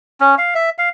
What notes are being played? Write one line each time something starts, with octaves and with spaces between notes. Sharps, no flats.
C#4
F5
E5
F5